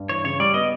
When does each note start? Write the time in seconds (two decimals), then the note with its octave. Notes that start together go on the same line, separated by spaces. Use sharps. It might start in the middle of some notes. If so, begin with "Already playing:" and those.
Already playing: G2
0.09 E3 C#5
0.24 C#3 C#5
0.40 G3 D5
0.54 B3 D#5